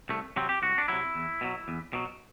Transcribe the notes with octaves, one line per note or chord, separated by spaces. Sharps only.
C2 A3
C3 F#3 C4
G4
C2 F#4
D4
C3 F#3 E4
E2
B2 F#3
E2
B2 F#3